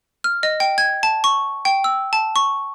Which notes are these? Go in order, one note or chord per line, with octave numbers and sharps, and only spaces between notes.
F6
D#5
G5
G#6
A5
C#6
G5
E6
A5
C#6